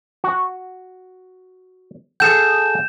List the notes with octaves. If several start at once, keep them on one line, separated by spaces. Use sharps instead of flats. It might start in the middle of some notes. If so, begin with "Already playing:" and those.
F#4
G#4 A4 F#5 G6 E7